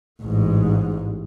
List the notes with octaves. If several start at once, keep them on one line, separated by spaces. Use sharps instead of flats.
A1 G#2